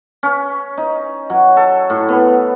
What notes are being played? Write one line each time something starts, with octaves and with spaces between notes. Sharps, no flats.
C#4
D#4
F#3
A4
A2
B3